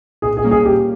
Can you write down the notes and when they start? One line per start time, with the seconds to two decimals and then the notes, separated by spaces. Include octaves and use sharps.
0.22 A#2 G#4
0.37 G#4
0.43 G3 A#3 C#4
0.51 G#4
0.65 A#2 G4